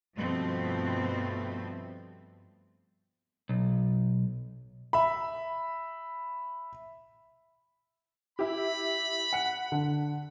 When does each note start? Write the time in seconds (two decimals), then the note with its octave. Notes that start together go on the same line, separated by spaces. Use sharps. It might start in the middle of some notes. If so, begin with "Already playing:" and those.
0.17 G2 B2 F3 A3 C4
3.49 B1
4.93 E5 B5
8.39 E4 G4 B5
9.33 F#5 C#7
9.72 D3